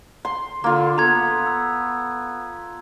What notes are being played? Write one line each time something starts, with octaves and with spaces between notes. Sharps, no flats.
C6
D3 A#3 F4
B3 A4 A#5 G#6
E6